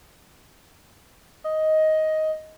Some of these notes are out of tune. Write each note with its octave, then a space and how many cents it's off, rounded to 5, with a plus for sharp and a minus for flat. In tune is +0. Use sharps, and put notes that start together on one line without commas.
D#5 +10